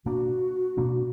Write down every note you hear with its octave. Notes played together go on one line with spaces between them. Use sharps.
B2 A#3 D4 F#4
B2 A#3 D4